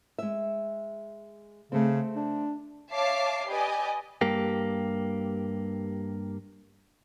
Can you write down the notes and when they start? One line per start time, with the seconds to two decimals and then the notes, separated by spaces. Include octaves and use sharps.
0.19 G#3 E5
1.72 C#3 A3 C4
2.16 D4
2.92 C#5 E5 F5 A5 D6 C7
3.48 G4 B4 D5 D#5 G#5
4.21 G2 A#3 G4